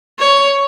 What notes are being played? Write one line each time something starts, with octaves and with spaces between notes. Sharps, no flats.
C#5